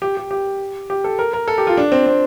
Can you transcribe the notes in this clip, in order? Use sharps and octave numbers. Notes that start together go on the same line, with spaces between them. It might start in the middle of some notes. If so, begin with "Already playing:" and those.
G4
G4
G4
G4
A4
A#4
A#4
A4
G4
F4
D4
C4
C4